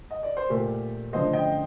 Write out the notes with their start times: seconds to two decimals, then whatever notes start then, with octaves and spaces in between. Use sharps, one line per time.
0.11 D#5
0.23 D5
0.37 C5
0.50 A#2 A3 G4 A#4
1.13 D3 F3 A3 C5 D#5
1.33 D#5 G5